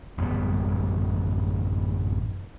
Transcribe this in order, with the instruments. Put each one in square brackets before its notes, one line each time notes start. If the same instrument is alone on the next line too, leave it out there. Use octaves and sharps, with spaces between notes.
[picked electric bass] A1 F#2 G3 B3